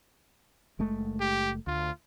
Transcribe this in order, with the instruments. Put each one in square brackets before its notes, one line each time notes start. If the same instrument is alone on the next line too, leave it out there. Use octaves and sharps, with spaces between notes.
[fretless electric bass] F#1 G#3 A3
[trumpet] G4
[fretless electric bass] D2 [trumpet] F4